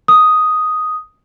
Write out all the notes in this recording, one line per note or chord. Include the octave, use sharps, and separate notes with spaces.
D#6